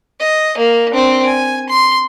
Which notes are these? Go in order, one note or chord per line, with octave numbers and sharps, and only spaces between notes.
D#5
A#3
C4 D4
G#5
C6